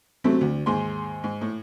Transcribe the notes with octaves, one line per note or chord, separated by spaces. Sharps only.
C3 F#3 A3 C4
D2
D#2 G#2 G#4 C6
G#2
A2